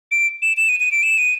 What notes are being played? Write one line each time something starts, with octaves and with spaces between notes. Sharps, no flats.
D7
E7
E7
D#7
D#7
D7
E7
D#7